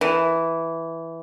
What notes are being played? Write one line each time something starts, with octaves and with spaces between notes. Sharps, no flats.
E3